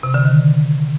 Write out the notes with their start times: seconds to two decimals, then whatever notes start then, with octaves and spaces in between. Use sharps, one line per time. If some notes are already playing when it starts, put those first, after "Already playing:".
0.03 C3
0.14 D3
0.25 D#3